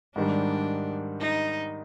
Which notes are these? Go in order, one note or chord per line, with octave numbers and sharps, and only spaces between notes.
G#2 D#3 G3 D4
D#4